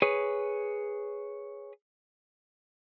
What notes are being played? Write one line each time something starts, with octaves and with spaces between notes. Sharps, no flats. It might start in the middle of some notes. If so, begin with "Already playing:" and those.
G#4 B4 C#5